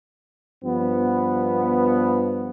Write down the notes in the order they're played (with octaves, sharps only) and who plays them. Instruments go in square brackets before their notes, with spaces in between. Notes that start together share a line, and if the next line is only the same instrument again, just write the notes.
[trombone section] G2 F3 B3